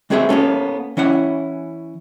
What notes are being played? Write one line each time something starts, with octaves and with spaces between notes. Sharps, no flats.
G#3 C4 F#4 G#4 B4 E5
A#3 B3 C#4 A4
E3 C#4 E4 F#5